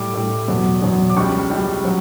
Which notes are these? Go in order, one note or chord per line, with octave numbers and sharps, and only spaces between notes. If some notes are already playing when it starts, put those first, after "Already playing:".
Already playing: A2 G3 D6
A2 G3
E2 B2 F#3
E2 B2 F#3
D6
C#2 C#3 G3 C#6
C#2 C#3 G3
F#3